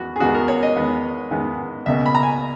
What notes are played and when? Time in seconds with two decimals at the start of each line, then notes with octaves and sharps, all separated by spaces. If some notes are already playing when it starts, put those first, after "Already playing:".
Already playing: E2 D#3 G#3 B3 F#4
0.16 G#4
0.20 E2 D#3 G#3 B3 F#4
0.34 A#4
0.48 C#5
0.63 D#5
0.76 E2 D#3 G#3 B3
1.31 E2 D#3 G#3 B3
1.86 C#2 B2 A#3 C#4 E5
2.06 B5
2.15 A#5
2.23 G#5